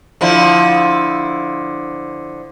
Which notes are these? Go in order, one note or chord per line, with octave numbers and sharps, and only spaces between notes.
D3 F3 E4